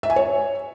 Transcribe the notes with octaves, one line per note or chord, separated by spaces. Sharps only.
E5
G#5
C#5